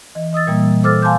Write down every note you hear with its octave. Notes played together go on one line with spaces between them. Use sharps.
E3 D#5
D#5 D#6 E6 A6
A#2 E3 G3 A#3
A4 C5 D6 E6 F6 A6
F5 G#5 A5 C6 D6 G6